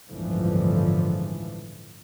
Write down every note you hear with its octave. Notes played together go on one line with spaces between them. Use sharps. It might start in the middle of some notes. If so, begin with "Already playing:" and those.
G1 C#2 A2 D3 E3 F3